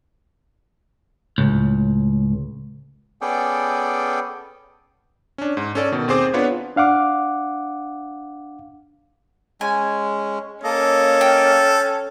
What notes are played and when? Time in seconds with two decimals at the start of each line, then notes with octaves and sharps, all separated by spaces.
1.38 C#2 A2
3.21 B3 C#4 G#4 A4 D5 G5
5.38 C#4 D4
5.57 G#2
5.75 C#4 A4 D5
5.92 B2 D#3
6.08 D#2 C4 G#4 C5 D6
6.34 B3 D4 F4 B4 C#5 F#5
6.76 D4 F5 F#5 D6
9.61 G#3 C#4 G#5
10.64 A#3 C#4 A4 D#5
11.21 G5